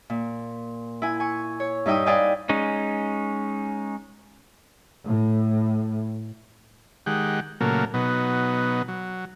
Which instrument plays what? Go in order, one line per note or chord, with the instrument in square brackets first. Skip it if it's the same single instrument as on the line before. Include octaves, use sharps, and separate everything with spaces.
[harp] A#2
E4 G#5
G#5 C#6
C#5
G2 D#4 E5 G5 D#6
B4 D5 D#5 F5 G5 G#5
[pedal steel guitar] G#3 C#4 D#4
[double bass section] A2
[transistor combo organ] D#3 G#3 G4 F#5
A#2 C#3 F#3 A3 A#3
B2 F#3 B3 D#4
F#3